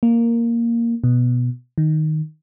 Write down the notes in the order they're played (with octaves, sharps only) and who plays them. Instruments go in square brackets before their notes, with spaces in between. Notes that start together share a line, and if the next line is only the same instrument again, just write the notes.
[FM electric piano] A#3
B2
D#3